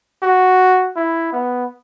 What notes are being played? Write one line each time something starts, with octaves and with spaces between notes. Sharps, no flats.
F#4
E4
B3